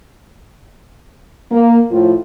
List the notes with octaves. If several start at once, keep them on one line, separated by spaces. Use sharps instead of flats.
A#3
A2 F3